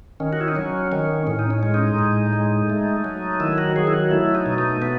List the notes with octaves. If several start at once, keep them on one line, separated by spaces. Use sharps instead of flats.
D#3 C#4
F#4
E4
D#4
F#3 C#4
D#3 C#4
A2 C#4
D#4
C#4
G#3
D#4
A2
G#3
A3
F#3
D#3 E4
F#4
F#3 G#4
E4
F#4
A3 E4
D#4
B2
D#4
A3 B3